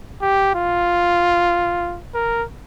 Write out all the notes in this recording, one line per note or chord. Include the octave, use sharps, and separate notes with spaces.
G4
F4
A#4